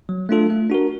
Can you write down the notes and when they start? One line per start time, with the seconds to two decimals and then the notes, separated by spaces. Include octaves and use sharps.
0.09 F#3
0.29 A3 D4 F4 A4
0.50 A3
0.70 D4 F#4 A#4